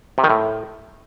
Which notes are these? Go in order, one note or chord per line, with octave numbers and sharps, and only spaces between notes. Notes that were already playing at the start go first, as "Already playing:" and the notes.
C3
D#3
A2